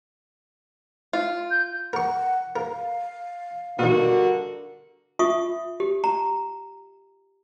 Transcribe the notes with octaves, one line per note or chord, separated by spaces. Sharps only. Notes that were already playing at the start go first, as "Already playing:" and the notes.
F4
G6
A#4 F#5 C#6
A#4 F5
G2 B2 D3 D#3 F#4 A#4
F4 E5 C#6 D#6
G4
A#5